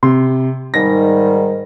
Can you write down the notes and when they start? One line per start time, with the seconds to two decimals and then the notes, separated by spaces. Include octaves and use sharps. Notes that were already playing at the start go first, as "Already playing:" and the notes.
0.03 C3 C6
0.74 G#2 D#3 G3 A#6